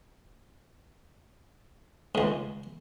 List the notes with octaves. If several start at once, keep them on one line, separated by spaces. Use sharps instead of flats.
C#2 G#2